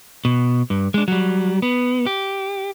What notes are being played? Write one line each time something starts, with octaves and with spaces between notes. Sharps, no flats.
B2
G2
G#3 D4
F#3 G3
B3
G4